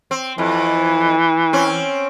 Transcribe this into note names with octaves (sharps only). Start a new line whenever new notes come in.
C4
F2 E3
C4 C#4